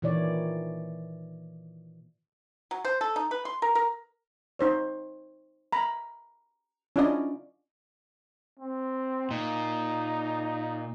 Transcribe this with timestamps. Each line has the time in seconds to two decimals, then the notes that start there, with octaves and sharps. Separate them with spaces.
0.02 A#2 D#3 E3 C#5 D5
2.71 F#3
2.85 C5
3.01 A4
3.16 D#4
3.31 B4
3.45 C6
3.62 A#4
3.75 A#4
4.59 D#4 C5 C#5
5.72 A#5 B5
6.96 C#4 D4 E4 F4 D5 D#5
8.59 C4
9.31 A#2 D#4